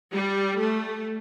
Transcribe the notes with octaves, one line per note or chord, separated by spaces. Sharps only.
G3
A3